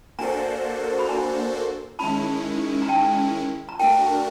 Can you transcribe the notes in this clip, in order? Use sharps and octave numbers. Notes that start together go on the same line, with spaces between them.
A#3 D4 F#4 A4 C5 G#5 A#5
B5
G#5 A#5
D#3 G#3 C#4 E4 A5 B5
A#5
G5 A5
A#5
A3 D4 F#4 A#4 G5 A5